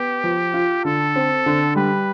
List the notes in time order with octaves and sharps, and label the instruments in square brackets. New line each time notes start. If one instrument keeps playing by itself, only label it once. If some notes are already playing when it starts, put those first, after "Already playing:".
Already playing: [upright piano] B3 [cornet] G4
[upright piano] F3
F4
[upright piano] D3 [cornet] A4
[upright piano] C4
D3
[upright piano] G3 [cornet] B4